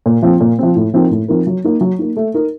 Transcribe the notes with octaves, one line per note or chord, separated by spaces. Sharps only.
A#2
F3 C4
A#2
F3 C4
A2
F3 C4 D#4 A#4
A2
F3 C4 D#4 A#4
F#3
A#3 D#4
F#3
A#3 D#4
A3
D#4 A#4